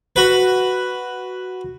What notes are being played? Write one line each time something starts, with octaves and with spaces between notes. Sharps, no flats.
F#4 B4